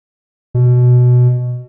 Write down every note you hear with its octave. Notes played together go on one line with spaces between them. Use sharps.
B2